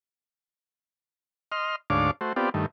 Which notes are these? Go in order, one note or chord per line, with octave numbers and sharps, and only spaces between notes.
D#5 C6 F6
D2 G#2 D4 C#5 F5 D6
A3 F#4 C5
B3 C4 F4 G4 D5
G2 D#3 A3